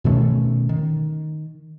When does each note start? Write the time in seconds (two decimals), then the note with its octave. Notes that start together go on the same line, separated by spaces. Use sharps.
0.04 B2 D#3 A3 C#4
0.69 D#3